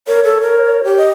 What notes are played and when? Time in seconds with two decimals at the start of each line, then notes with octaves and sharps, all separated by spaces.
0.08 A#4 C#5
0.24 A4
0.41 A#4
0.84 G4
0.97 D#5